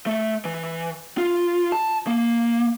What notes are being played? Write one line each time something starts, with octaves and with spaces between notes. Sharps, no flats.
A3
E3
F4
A5
A#3